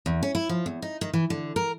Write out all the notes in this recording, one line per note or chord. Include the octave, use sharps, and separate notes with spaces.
E2
C#4
E4
F3
E2
D#4
D#3
E3
D3
A#4